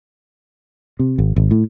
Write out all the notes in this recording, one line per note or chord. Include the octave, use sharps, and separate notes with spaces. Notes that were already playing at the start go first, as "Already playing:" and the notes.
C3
G#1
G#1
A2